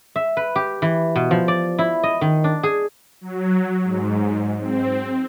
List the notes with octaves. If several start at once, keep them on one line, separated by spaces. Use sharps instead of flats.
E5
B4
G4
E3
B2
F3
D5
E4
D#5
D#3
D4
G#4
F#3
G#2
C4